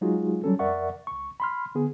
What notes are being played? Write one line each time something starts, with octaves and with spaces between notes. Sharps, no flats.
F#3 G#3 D#4 F4 F#4 G#4
F#3 G3 C#4 A4
F2 A#4 D5 E5 F#5 C#6
C#2 C#6
B5 C6 F6
D3 B3 G#4